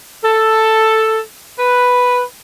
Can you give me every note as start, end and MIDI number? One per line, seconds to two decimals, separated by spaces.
0.24 1.21 69
1.59 2.22 71